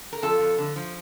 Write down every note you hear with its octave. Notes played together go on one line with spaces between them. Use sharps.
A#4
F2 F4 A4
F2
D3
F3